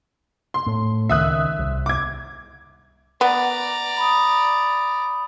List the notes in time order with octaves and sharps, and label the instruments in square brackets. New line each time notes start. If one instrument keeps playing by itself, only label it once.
[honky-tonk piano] C6
[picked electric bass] A2
[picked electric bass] C#2 D#3 [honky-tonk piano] E5 D#6 F#6
[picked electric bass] C2
[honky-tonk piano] D6 G#6
[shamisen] B3 [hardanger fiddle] D5 A#5
[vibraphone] B5 D#6